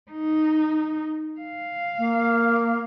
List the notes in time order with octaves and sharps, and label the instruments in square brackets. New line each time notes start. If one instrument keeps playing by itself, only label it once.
[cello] D#4
F5
[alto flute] A#3